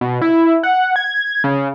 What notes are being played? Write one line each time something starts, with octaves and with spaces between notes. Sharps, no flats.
B2
E4
F#5
G#6
C#3